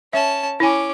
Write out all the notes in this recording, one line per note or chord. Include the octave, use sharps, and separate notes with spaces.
C#4 E5 A5
C#4 E4 G#5 D6